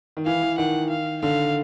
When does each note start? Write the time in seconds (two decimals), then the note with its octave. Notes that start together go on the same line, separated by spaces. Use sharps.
0.17 D#3
0.26 E3 F5
0.42 E3
0.58 D#3 F#5
0.90 F5
1.22 D3 F5